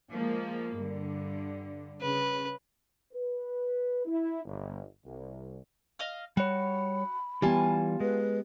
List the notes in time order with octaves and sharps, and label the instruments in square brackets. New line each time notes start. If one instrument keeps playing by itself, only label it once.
[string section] F3 G#3 A#3
G2 D3
[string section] C#3 [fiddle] B4
[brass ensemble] B4
E4
G1
C2
[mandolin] D#5 F5 F6
[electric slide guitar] G3 C#5 [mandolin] F#4 [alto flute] B5
[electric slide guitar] E3 G3 [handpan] B3 G4 [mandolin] F4 G#5 A5
[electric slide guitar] G#3 [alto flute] B4